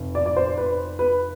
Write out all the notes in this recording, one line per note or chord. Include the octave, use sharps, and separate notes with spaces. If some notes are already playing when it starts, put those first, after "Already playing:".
Already playing: F1
D5
D5
C5
B4
B4